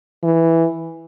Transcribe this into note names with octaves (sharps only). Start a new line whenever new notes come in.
E3